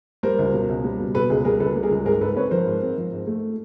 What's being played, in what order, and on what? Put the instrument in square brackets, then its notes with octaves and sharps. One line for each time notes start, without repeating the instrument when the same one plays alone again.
[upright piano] G3 A#4 C5
C#2
B2
C#2
G3
B2
B2 A4 B4
C#2 G#4
G3 G#4 A#4
C#2 A4 B4
G3
G#4 A#4
C#2
G#2 G#4 A#4
G#2 A4 B4
C4 B4 C#5
F3 A#4 C5
G#2
C4
F3
G#2
A3